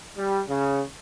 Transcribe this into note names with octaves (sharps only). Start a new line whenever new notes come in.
G3
C#3